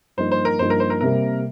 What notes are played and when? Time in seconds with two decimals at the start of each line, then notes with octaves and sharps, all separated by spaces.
0.17 G2 F3 A#3 D#4 C5
0.32 C5
0.45 A#4
0.59 G2 F3 A#3 D#4 C5
0.70 A#4
0.80 C5
0.90 A#4
1.01 C3 G3 A#3 A#4